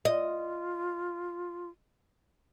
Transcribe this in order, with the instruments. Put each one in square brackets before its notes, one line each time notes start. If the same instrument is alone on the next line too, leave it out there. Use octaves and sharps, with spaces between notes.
[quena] F4 [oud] D#5